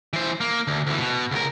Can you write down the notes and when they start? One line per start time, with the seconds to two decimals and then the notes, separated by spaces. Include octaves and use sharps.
0.13 E3 C5
0.41 A#3
0.68 D2
0.87 D2 E3
0.98 B2
1.31 C#2 A#4